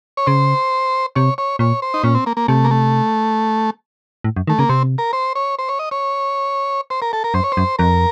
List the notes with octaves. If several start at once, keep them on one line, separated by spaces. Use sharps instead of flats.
C#5
C#3 C5
C3 C#5
C#5
A#2 C#5
C5
D#4
A#2 C#4
C4
A#3
A#3
C3 A3
A#3
A3
A2
F#2
D#3 A3
C#3 A#3
C3 C4
A#4
C5
C#5
C5
C#5
D#5
C#5
C5
A#4
A4
A#4
F#2 C5
C#5
C5
F#2
F2 A#4